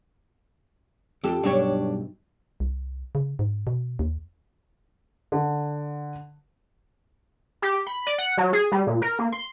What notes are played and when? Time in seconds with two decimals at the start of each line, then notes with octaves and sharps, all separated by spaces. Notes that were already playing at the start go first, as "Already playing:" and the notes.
1.24 F2 G4 A4
1.43 B1 G2 D4 G4 C#5
2.60 C2
3.15 C#3
3.39 G#2
3.67 B2
3.99 D#2
5.32 D3
7.62 G4
7.87 B5
8.07 D5
8.18 F#5
8.38 F#3
8.53 G#4
8.72 G3
8.87 A#2
9.02 A#4
9.19 A#3
9.32 C6